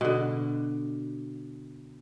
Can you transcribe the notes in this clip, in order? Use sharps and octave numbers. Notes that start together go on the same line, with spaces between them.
B2 D3